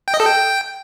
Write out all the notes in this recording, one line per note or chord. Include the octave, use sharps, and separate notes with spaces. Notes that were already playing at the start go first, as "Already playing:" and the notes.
G5
D#5
A4
G5